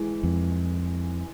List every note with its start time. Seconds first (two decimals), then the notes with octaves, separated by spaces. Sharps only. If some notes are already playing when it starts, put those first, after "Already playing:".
Already playing: E3 G#3
0.23 F2